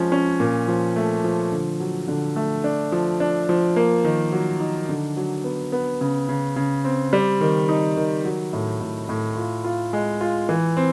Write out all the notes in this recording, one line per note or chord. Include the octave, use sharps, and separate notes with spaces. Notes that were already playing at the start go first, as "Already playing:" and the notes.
Already playing: F3 G#3 C#4
C#4
A#2
F3
A3
F3
D3
F#3
D3
A3
D4
F3
D4
F3
A#3
D#3
F#3
D#4
D3
F#3
B3
B3
C#3
C#3
C#3
C4
G3
D#3
D#4
D#3
F#3
A2
A2
A2
F4
F4
G#3
F4
E3
C4